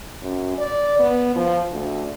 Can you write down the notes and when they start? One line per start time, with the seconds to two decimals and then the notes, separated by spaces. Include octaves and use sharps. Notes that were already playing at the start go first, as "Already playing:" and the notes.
0.22 F#2
0.58 D5
1.00 B3
1.36 F3
1.72 D2